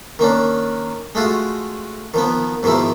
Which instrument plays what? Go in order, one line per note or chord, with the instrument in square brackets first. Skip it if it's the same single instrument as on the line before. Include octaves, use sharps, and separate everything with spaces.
[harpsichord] D#3 A#3 C#4 D4
G#3 A3 F4 F#4
D#3 F3 B3
G#2 B2 D#3 F3 E4